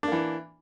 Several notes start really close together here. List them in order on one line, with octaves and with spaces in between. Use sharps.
D4 A#3 E3